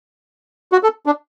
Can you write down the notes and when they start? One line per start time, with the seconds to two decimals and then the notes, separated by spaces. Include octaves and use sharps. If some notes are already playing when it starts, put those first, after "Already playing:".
0.72 F#4
0.83 A4
1.06 D4